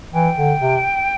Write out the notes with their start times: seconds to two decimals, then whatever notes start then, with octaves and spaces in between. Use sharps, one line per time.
0.13 E3 G5
0.37 D3
0.60 C3